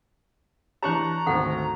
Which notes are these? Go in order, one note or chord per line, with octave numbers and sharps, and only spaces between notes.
E3 D4 G4 C#5 A5 A#5 C#6 F#6
G#1 D2 A4 F#5